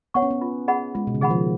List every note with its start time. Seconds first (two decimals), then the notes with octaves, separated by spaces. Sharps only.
0.14 B3 C#5 F#5 C#6
0.22 C#4
0.31 B3
0.41 F4
0.68 G#4 D#5 F#5 B5
0.95 G#3 F4
1.07 B2
1.15 C#3
1.21 D#3 G#4 D#5 F#5 B5
1.30 F3